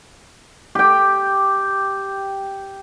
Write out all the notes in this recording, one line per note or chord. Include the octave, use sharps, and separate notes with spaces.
G4 G5